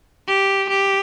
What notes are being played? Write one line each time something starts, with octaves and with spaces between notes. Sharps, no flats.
G4
G4